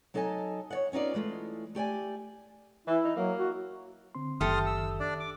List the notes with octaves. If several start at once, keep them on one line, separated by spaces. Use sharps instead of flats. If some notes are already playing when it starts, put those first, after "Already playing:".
F#3 D#4 A4 D#5 G#5 A5
C#5 D5 F#5
B3 C#4 D#4 F4 D5
E3 G#3 A3 F4
A3 G4 D5 G#5
E3 E4
D#4
F#3 A#3
F#4
D3 C4 C6
F#1 D#3 G4 A4 E5 C6 D#6 F6
E6
D4 D5
D6